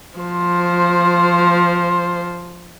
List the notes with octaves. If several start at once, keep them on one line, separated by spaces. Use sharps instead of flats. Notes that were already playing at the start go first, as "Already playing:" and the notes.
F3 C5